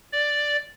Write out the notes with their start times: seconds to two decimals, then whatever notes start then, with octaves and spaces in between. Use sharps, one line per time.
0.13 D5